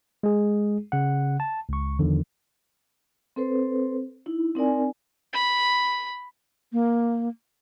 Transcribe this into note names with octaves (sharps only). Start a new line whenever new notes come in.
G#3 G#4
C#3 F#5
A5
C#2 C#6
E2 D3 D#3 F3
C4 A4 B4 C5
D#4 E4
C4 D#4 A#4 D5 G#5
B5
A#3